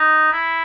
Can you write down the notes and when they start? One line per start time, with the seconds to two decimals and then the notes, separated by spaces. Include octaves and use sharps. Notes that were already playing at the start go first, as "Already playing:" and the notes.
Already playing: D#4
0.33 E4